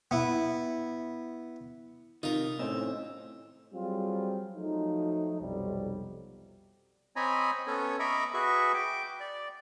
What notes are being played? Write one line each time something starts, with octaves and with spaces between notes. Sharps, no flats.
B3 E4
C3 D#3 D#4 F4 A#4
A2 C4 C#4 D#4 E6
F#3 G3 C4 F4 G#4
F3 F#3 A3 D#4
B1 F2 C3 F#3 G3
C4 C#5 D#5 G#5 A#5 B5
B3 C#4 A4 C#5
D#5 E5 A#5 B5 C#6 D6
F#4 G#4 B4 E5 C#6
G5 D6
D5